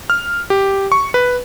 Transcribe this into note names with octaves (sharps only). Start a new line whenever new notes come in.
F6
G4
C#6
B4